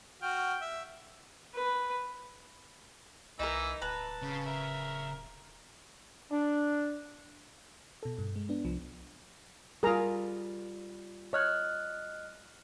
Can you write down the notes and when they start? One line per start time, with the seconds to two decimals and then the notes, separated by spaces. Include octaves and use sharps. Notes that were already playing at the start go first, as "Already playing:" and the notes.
0.22 F#4 G5 F6
0.61 E5
1.55 B4
3.39 C2 E3 D#4 A#4 E6
3.82 D1 B4 A5 A#5
4.22 C#3
4.46 A#4 E5
6.31 D4
8.03 B2 A4
8.19 G2
8.36 G#3
8.49 B3 D4
8.65 C2 F3
9.83 G3 F4 G#4 A#4 A#5
11.33 C#5 D#5 F6 F#6